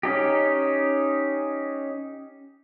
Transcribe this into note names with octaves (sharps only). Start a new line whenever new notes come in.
C#4 D#4 G4